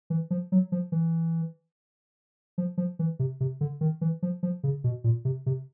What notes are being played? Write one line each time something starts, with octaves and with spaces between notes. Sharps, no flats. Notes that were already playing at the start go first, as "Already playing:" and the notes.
E3
F3
F#3
F3
E3
F3
F3
E3
C3
C3
D3
D#3
E3
F3
F3
C#3
B2
A#2
C3
C3